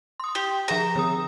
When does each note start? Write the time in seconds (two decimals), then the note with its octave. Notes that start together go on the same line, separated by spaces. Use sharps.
0.20 C6 D#6
0.35 G4
0.68 F3 G#4 A#5 E7
0.96 D3 D#6